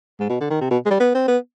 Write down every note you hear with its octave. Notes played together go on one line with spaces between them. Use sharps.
G#2
B2
D3
D#3
C3
B2
G#3
G3
B3
C4
B3